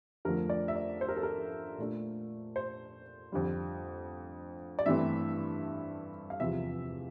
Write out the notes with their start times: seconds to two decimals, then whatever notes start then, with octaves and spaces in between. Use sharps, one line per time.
0.25 F2 D3 F3 A3 A#4
0.50 D5
0.68 E5
0.76 D5
1.01 C5
1.09 A#4
1.17 A4
1.23 A#4
1.78 A#2 A3 D4
2.56 C5
3.32 F2 D3 G3
4.79 D5
4.86 G2 E3 A3 C4 E5
6.30 F5
6.40 E2 C3 F3 E5